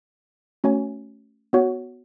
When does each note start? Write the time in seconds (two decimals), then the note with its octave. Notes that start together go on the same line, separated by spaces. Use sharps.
0.64 A3 C#4 F#4 C#5 G#5
1.53 B3 F#4 C#5 F#5